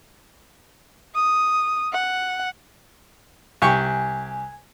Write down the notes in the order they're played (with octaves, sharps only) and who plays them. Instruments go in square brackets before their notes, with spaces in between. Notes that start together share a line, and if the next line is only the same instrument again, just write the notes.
[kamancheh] D#6
F#5
[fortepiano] C2 G4 C#6 [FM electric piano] G#5